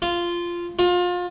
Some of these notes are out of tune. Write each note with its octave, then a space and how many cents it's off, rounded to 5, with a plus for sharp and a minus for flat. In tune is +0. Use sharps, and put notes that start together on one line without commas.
F4 -10
F4 +30